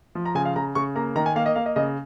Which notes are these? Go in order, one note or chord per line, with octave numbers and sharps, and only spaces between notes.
F3
A#5
C#3 G#5
F5
C#3 A#5
C#3 C#6
A#3 A#5
D#3 A#5
G#5
A#3 F5
D#5
A#3 F5
D#5
C#3 D#5